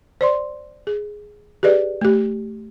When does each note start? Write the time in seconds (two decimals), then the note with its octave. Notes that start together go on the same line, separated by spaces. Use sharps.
0.21 C5 D5 C6
0.87 G#4
1.63 G4 G#4 B4 D5 D#5
2.01 A3 G4